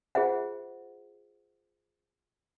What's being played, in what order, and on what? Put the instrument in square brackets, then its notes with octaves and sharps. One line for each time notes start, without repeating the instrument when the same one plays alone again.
[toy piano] F4 G#4 C5 E5 F#5